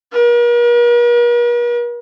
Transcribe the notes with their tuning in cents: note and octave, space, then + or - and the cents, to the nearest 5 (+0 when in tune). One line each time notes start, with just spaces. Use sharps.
A#4 +45